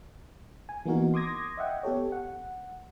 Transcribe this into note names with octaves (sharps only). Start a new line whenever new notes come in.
G#5
E3 A#3 B3 D#4 F#4 A#4
C6 D6 D#6 G#6 A#6
D#5 E5 F#5 G5
B3 G4 A4 C#5
F#5